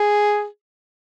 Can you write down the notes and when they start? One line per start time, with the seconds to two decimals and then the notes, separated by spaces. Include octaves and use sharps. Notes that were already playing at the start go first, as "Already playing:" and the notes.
Already playing: G#4